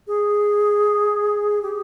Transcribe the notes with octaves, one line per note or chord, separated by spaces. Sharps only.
G#4
G4